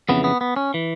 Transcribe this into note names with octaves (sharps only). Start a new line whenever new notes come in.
F2 C#3 E3 B3
B3
B3
C#4
E3